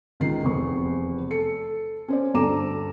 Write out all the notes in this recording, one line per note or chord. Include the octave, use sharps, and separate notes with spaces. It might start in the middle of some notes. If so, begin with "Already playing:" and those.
C#2 D#3 C7
F1 E2 C4 C#6
A4 C#7
C#4 C5 D5
D2 G2 A4 A#5 D6 E7